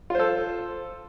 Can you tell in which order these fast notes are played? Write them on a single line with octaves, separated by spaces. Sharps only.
F4 C5 A4